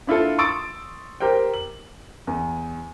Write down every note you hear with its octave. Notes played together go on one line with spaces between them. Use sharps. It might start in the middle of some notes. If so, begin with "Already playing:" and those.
D4 E4 F4 A4
C6 C#6 D#6 E6 A6 D7
G4 A#4 C5 G5
F#7
E2